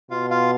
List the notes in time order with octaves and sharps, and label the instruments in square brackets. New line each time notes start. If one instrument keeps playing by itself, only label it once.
[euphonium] B2 [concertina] F4 F5
[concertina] F4 F5